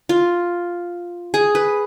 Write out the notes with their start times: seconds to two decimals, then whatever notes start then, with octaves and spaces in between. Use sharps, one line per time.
0.09 F4
1.34 G#4
1.55 B4